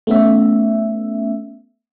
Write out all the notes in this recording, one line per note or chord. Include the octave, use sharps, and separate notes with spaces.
A3 B3 C#4 E5